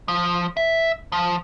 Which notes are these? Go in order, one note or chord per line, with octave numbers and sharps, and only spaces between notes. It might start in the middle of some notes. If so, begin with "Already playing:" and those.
F3
E5
F3